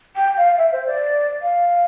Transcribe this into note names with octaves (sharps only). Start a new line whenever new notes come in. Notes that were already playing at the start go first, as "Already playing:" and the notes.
G5
F5
E5
C5
D5
F5